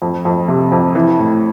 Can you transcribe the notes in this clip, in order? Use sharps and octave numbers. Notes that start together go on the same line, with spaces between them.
F2
F2
C3
F2
E3
A2